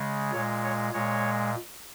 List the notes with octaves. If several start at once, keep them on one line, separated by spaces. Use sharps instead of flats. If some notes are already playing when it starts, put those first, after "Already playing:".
Already playing: C#3 G#3
A#2 G#3 C#5
C#5
A#2 G#3 C#5